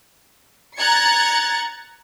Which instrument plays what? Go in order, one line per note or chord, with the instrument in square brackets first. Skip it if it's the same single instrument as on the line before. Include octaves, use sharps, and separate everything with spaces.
[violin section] A#5 F#6 G#6 A6 C#7